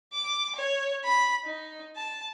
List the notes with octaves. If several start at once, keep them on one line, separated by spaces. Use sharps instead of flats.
D6
C#5
B5
D#4
A5